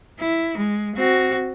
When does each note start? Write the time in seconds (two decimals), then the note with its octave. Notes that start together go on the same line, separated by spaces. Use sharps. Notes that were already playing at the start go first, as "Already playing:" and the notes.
0.19 E4
0.58 G#3
0.95 C4 F#4